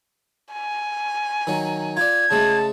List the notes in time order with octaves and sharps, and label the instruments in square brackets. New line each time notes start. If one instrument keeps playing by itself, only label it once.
[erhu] G#5
[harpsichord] D#3 F#3
[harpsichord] F4 D5 [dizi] G#6
[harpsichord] C#3 G#3 A3 [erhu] A5